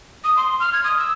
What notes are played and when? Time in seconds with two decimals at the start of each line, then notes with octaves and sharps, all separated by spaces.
0.24 D#6
0.37 C6
0.60 F6
0.73 G#6
0.84 D#6
0.98 E6